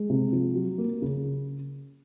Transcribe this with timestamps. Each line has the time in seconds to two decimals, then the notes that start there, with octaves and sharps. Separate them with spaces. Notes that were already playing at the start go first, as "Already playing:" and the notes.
Already playing: G#3
0.10 C3
0.33 F3
0.55 F#3
0.78 A#3
1.02 C#3